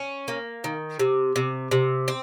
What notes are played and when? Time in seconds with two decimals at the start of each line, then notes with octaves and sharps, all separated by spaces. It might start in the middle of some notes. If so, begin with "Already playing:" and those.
Already playing: C#4
0.28 A#3
0.64 D#3
0.99 C3
1.36 C3
1.71 C3
2.08 C4